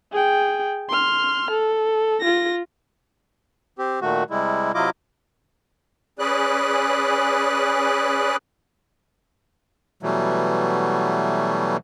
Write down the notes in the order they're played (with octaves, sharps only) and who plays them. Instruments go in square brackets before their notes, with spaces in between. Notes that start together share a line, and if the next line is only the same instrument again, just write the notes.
[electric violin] G#4 G5
C6 F6
A4
F4 A#6
[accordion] C4 G4
A#2 D#3 A3 F#4
C3 G3 G#3 E4
C3 F#3 E4 F4 D#5 D6
C#4 G#4 B4 D5 F#6
[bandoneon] B2 E3 F#3 G3 A3